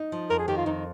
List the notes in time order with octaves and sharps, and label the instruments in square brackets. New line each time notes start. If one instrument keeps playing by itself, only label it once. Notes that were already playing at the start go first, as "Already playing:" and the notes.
Already playing: [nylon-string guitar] D#4
F3
[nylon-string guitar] F2 [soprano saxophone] A#4
[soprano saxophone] G#4
[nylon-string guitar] D#3 [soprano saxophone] G4
[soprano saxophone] F4
[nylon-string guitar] F2 [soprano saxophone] D#4